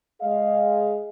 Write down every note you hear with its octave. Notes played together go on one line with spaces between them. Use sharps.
G#3 G#4 D#5 F5